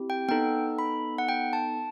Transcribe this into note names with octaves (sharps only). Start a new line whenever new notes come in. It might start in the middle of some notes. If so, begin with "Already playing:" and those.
Already playing: C4 E4 G4
G5
B3 D#4 A4 G5
B5
F#5
G5
A5